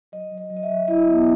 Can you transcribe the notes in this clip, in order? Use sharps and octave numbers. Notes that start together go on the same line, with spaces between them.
F#3 D#5
F#3
D#5
F#3
D#5
E5
F#3
E4 D#5
B3